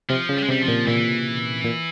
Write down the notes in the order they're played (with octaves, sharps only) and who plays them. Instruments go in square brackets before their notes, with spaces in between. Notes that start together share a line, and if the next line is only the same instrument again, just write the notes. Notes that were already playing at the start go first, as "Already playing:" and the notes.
[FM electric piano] C3 [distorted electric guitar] F3
[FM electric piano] C#3
[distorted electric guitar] G3
G#3
[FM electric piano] C3 [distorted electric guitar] G3
[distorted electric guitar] F3
[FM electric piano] A#2
[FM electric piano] A#2 [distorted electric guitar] E3
[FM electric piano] A#2